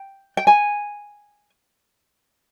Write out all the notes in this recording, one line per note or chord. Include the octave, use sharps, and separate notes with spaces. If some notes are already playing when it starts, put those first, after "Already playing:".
Already playing: G5
G5
G#5